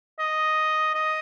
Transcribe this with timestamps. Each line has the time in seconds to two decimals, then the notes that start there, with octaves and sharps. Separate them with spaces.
0.19 D#5
0.94 D#5